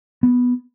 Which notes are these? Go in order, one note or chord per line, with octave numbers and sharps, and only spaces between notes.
B3